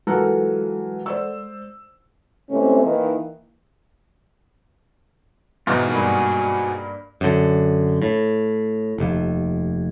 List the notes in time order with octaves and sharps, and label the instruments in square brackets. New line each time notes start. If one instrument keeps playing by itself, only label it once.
[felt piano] E3 F#3 F4 [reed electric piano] G#3 [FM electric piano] A4 A#4 F#5
[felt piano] C5 D5 E6
[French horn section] C3 E3 G#3 A3 C4 C#4
D#3 E3 A#3
[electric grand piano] G#2 B2 [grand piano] E3 [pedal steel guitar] G#3 D#4 F4
[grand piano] G2 A#3 [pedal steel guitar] F#4 G#4
[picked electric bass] F#2 D3
A2
F1 D#2